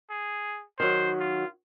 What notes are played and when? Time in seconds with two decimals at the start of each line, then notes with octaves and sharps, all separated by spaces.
0.10 G#4
0.80 D#3 F#3 C5
1.20 F4